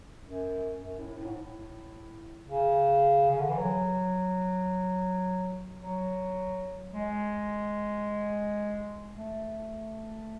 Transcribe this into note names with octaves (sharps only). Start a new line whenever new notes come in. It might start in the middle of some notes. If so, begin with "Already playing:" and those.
F#2
F#2
A2
A2
G#2
A2
C#3
C#3
D3
E3
F#3
F#3
G#3
A3